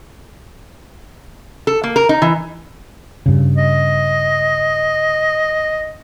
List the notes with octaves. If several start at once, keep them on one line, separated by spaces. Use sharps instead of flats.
A4
A#3
A#4
D#4
E3
G2 C#3
D#5